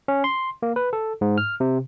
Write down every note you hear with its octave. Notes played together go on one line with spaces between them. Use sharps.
C#4
C6
A#3
B4
A4
G#2
F6
C3